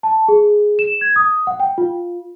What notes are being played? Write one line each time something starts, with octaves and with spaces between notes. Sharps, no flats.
A5
G#4
E7
G#6
D#6
F#5
G5
F4